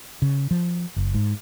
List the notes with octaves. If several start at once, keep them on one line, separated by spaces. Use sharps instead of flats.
C#3
F3
F#1
G#2